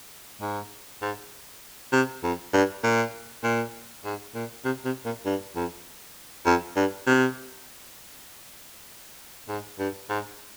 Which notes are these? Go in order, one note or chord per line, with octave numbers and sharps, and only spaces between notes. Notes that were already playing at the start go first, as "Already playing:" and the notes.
G#2
G#2
C3
F2
G2
A#2
A#2
G#2
A#2
C3
C3
A#2
G2
F2
F2
G2
C3
G#2
G2
G#2